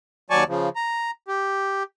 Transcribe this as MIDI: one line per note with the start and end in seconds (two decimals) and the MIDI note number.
0.30 0.44 39
0.30 0.44 54
0.30 0.44 74
0.30 0.44 80
0.30 0.44 81
0.30 0.44 85
0.48 0.69 49
0.48 0.69 53
0.76 1.11 82
1.28 1.83 67